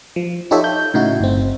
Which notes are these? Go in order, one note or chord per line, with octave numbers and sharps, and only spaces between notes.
F3
D#4 F4 G4 A4 C#5 E5
G6
A2 C#3 D#4 E4 F#4
G1 C4